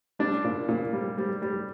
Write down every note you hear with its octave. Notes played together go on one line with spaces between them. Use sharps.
G3 D4
A#2
A#2
G3
G3
G3